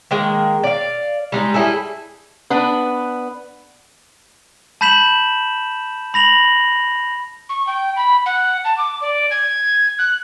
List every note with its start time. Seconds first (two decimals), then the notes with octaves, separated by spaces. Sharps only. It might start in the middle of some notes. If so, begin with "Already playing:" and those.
0.11 D#3 G#3 A#3
0.64 D5 F5
1.32 G3 G#3 D#4
1.54 G3 E4 G#4 A4
2.50 B3 D4 B4
4.81 A5 B5 G6 B6 E7 F#7
6.14 B5 A#6 F7 F#7
7.49 C#6
7.67 G5
7.96 B5
8.26 F#5
8.65 A5
8.78 D6
9.01 D5
9.30 G#6
9.99 F#6